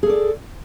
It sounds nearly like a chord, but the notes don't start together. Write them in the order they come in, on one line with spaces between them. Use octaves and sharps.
G#4 A4 D5